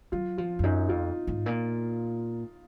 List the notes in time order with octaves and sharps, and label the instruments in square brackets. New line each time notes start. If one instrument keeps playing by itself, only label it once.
[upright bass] F#3 [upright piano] F4
[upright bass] F3 [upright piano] F4
[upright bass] F2
[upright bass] F#2 [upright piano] D#4
[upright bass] F2 [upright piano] F4
[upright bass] G#2
A#2